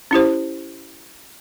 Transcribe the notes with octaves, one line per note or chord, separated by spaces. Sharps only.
C#4 E4 G4 C5